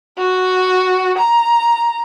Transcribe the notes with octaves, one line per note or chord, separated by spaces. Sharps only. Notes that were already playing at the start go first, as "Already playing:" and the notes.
F#4
A#5